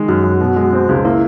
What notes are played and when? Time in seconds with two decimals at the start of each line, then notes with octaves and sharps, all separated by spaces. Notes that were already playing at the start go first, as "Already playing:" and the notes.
Already playing: D#3 G#3
0.08 F#2 F#4
0.23 F#2
0.41 B2
0.56 G#3
0.73 C4
0.89 C#2
1.05 A#3 E4